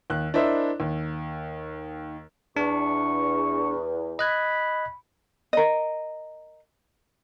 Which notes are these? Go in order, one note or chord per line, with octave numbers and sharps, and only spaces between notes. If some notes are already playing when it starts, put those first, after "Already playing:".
D#2 F#6
D4 E4 A#4 C5 D#5 E5
D#2
E2 D4 C#6
D#5 B5 F#6 G#6
A#4 D#5